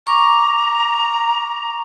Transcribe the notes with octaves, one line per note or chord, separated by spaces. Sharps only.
A#5 C#6 D6